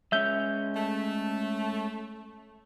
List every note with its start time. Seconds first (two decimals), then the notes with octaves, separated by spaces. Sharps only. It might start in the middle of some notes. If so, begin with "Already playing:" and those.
0.12 G#3 C#4 E5 G6
0.77 A3